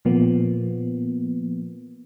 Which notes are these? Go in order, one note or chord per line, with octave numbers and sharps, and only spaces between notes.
A#2 F3 A#3 B3